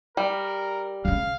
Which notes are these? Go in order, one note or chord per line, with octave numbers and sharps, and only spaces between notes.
G3 A#4
C#3 C#4 F5